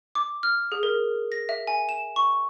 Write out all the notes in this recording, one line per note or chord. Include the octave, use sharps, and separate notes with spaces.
D6
F6
G#4
A#4
A#6
E5
G#5
E7
C#6